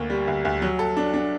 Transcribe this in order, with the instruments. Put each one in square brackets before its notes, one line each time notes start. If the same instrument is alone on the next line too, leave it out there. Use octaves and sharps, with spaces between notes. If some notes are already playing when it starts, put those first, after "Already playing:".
Already playing: [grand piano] D2 A#3
G3
D2
D2
F#3
A4
D4
D4